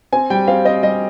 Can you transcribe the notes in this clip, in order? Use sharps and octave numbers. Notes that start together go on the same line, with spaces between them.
C4 G#5
G3 G5
C4 F5
C4 D#5
G3 D#5